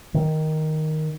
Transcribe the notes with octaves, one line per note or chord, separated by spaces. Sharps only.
D#3